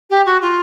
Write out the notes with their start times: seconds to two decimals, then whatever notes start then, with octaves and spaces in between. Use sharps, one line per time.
0.10 G4
0.26 F#4
0.41 F4